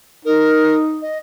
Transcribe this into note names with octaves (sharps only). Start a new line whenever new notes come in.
D#4 A#4
D#5